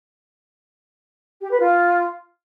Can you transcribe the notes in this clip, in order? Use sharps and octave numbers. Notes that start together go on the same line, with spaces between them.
G4
B4
F4